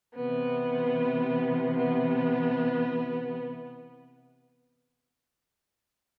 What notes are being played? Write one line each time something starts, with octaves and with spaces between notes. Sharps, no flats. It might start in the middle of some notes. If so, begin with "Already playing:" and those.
C3 E3 B3
B3